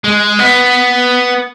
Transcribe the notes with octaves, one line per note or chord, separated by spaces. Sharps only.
G#3
B3